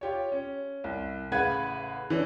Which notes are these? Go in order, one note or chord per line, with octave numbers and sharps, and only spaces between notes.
F4 G4 C#5
C#4
C2
A1 C#3 B4 F5 F#5 G#6
E3 C#4 D4